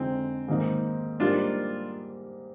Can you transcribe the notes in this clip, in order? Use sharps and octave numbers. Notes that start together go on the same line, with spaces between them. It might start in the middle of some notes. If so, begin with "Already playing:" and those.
Already playing: F2 D3 G#3 C4 D#4
G#2 D#3 A#3 D#4
G#2 G3 A#3 D4 D#4 F4 A#4